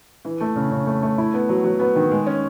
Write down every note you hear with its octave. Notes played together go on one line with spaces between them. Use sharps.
E3
A3
C#3
C#3
A3
A3
E4
B3
F#3
F#3
B3
D#3
G#3
C#4